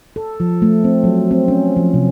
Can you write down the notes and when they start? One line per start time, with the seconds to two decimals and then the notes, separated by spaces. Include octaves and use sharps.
0.16 A4
0.40 F3
0.62 A3
0.84 C4
1.04 F#3
1.31 C4
1.48 C#4
1.76 F3
1.94 C3